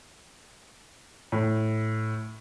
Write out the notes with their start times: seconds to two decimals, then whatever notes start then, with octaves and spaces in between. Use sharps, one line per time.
1.32 A2